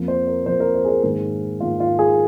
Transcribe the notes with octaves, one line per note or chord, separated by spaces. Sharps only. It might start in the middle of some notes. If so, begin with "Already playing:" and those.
Already playing: F2 F3 A#3
C5
A#4
F2 F3 A#3 C5
A#4
C5
G#4
A#4
G#2 D#3 A#3 G#4
G#2 D#3 A#3 F4
F4
G#4